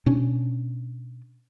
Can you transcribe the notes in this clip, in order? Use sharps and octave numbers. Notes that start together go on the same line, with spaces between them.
B2 C#4 D4